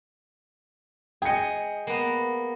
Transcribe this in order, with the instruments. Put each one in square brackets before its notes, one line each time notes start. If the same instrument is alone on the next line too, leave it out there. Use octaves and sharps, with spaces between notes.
[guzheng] G#4 D#5 [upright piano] G5 C#7
[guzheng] A#3 B3